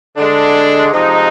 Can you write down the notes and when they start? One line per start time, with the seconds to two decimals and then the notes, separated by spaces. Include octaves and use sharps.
0.17 D3 G#3 D4
0.93 C3 F3 G#3 D#4